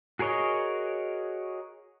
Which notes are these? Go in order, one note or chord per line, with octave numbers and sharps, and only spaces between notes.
F#4 G#4 A#4 C#5 D#5